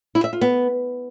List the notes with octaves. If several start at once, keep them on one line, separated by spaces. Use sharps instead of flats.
E4
E5
F4
B3